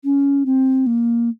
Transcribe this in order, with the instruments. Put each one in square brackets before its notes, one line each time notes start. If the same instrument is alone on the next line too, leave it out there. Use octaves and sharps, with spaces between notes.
[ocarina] C#4
C4
A#3